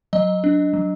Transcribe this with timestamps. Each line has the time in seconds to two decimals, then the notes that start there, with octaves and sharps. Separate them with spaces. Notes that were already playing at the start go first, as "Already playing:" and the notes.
0.13 F#3 D#5
0.44 D4
0.73 F#3